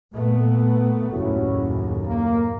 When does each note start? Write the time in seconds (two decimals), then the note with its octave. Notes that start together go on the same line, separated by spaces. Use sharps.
0.13 A#2 A3 B3
1.11 F#1 D#2 A2 C#4 E4 F#4
2.06 A#3